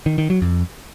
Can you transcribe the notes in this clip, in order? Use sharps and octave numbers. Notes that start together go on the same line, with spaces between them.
D#3
D#3
F#3
F2